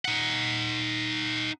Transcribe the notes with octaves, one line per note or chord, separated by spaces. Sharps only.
D#4 F#5